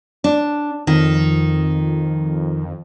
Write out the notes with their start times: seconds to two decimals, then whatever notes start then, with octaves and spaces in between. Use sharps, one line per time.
0.24 D4
0.87 F2 D#3